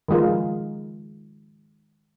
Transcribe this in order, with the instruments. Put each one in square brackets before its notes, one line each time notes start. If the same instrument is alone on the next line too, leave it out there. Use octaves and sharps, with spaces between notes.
[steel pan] D#3 F3 G#3 F4 A#4